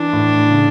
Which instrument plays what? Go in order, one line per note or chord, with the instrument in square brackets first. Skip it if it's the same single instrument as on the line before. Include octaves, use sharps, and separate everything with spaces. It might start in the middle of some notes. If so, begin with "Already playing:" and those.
Already playing: [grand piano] E3 [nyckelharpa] D4
[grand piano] A2
C#3